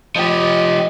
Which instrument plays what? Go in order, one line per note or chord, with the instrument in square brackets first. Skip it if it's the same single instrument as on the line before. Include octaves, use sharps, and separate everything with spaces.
[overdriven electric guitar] F3 G4 [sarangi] D#5